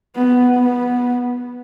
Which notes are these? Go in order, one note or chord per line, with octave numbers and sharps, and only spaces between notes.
B3
B3